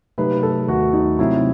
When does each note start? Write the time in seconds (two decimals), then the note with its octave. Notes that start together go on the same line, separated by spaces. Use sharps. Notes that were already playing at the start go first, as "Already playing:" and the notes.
0.18 C3 F#3 A3 D#4 G4 B4
0.43 A4
0.68 D#2 D#3 A3 F#4
0.93 D#4
1.19 C3 F#3 A3 C4 D#4 E4